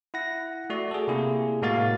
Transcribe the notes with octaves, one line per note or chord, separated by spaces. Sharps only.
E4 F#5 A#6
A3 F#4 D5
G#4 A4
C3 A#3 E4 G#4
A2 G#3 A#3 F#4 F5 A6